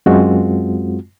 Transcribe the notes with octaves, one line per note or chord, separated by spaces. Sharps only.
F#2 G#3 C4 F4 F#4